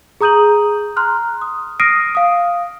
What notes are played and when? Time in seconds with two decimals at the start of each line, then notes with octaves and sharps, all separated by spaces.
0.21 G#4 A#5 D#6 G6 D#7 F#7
0.96 A#5 C6 F6 F#6
1.41 D#6
1.80 D#6 F6 A#6 C7 D7 D#7
2.15 F5 D#6